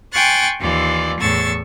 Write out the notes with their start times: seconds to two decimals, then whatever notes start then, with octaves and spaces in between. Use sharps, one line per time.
0.13 G5 G#5 C6 C#6 F#6 A6
0.60 D#2 E3 F4 D5
1.19 E2 A2 C#6 E6 A6